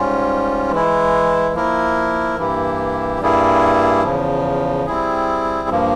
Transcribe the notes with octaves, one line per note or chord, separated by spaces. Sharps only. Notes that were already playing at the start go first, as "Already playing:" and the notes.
Already playing: G#2 G3 C#4 F4
E3 G#3 E4
F3 A#3 E4 A#4
G2 E3 A#3 E4 G4
G2 G3 A#3 E4 G#4
E2 C#3 F3
G3 C4 E4 G#4
G2 F3 A#3